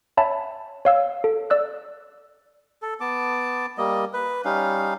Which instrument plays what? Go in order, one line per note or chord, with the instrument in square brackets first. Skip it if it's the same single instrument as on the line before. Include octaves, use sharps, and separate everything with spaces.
[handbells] C#5 E5 G#5 A5 B5
C#5 F5 E6
A4
D5 E6 F#6
[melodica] A4
B3 A5 D6
G3 A#3 D#5
B4
G3 C#4 D#4 F5